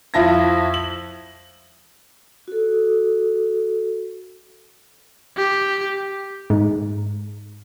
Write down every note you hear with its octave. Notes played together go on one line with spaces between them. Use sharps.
F2 E4 F4 E5 A5 A#6
F#7
F#4 A4
G4
G#2